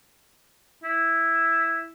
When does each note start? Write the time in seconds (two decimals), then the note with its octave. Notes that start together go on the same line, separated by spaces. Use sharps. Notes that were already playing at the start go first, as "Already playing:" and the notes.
0.83 E4